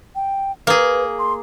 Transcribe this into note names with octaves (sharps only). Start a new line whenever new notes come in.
G5
A#3 G#4 B4
C6